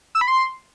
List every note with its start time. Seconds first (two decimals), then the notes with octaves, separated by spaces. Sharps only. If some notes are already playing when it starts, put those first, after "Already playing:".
0.15 E6
0.21 B5
0.28 C6